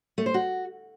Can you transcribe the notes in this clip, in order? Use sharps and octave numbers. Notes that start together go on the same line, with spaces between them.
A3
C5
F#4